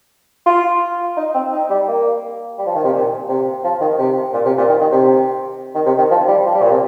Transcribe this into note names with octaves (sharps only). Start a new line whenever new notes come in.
F4
D#4
C4
D#4
G3
A#3
G3
F3
D#3
C3
A#2
C3
F3
D#3
C3
A#2
C3
A#2
D#3
D#3
C3
D#3
C3
D#3
F3
G3
F3
G3
A#2
C3